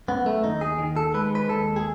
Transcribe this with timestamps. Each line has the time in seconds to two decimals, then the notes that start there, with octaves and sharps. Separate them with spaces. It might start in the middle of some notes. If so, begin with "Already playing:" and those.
0.08 F#2 B3
0.26 A3
0.43 D#2 D#4
0.61 G#4
0.78 D#3
0.96 A4
1.14 G#3 B4
1.35 B4
1.49 D#2 A4
1.76 G#4